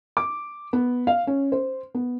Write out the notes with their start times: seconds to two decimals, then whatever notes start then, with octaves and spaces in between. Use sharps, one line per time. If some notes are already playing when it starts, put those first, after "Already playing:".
0.17 D6
0.73 B3
1.07 F5
1.27 C#4
1.52 C5
1.95 B3